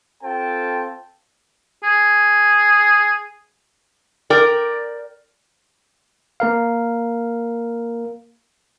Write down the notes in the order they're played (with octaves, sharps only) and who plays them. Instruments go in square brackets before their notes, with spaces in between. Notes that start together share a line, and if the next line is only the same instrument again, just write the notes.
[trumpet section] C4 F4 A4 C5 G5 A5
[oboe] G#4
[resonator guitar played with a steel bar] A#4 D5 G5
[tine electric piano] A#3 A#4 F5